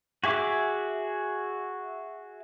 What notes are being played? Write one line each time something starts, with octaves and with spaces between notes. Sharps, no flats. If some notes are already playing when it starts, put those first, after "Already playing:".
F#4 G#4 E5 D6